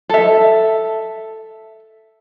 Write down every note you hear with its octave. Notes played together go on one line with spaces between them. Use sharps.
A4 E5